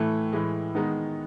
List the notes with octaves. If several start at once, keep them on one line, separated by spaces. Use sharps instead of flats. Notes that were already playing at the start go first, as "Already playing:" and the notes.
Already playing: A2 E3 A3
A2 E3 G#3
D#3 G#3 B3 D#4